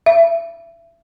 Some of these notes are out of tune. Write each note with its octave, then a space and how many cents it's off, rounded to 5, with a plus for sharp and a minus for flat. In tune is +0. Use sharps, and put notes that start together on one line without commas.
E5 +30